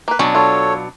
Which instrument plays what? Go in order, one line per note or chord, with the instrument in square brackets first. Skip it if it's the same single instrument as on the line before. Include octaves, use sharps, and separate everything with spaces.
[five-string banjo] A#3 B4
[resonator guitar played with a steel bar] B2 F#3 D4 [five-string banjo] C#4
[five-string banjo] F4 [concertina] A4 C#5